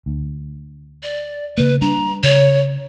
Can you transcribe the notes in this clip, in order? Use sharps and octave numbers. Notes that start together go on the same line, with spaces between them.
D2
D5
C#3 A#3 B4
G3 D4 A#5
C#3 C#5